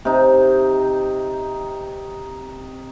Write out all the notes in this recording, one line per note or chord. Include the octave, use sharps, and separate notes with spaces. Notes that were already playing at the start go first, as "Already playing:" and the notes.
C3 D#4